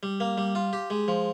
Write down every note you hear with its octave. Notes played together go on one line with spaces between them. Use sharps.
G3
A#3
G3
F4
G4
G#3
F3